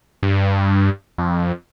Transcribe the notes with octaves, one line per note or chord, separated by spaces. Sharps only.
G2
F2